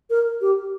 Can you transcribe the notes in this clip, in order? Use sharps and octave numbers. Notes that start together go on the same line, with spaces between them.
A#4
G4